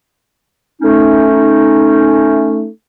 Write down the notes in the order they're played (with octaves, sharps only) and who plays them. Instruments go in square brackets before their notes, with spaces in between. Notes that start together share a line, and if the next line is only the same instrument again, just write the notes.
[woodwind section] A3 C#4 D#4